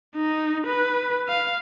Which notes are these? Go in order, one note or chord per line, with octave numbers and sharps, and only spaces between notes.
D#4
B4
F5